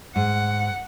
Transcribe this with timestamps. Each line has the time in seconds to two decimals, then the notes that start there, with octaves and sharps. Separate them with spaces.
0.16 G#2 F#5